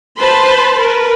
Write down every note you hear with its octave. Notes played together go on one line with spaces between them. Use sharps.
B4 C5 A5 B5 C6
A#4 B4